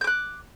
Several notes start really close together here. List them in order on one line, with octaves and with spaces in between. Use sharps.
G6 D6 F#6